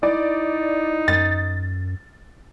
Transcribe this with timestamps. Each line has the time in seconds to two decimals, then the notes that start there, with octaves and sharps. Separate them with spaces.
0.03 D#4 E4 D5
1.08 F#2 A6